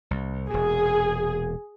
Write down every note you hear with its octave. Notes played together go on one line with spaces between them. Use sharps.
C2
E1 A#2 G#4